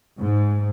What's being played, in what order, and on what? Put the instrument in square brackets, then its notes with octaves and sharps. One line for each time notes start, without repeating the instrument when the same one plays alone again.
[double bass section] G#2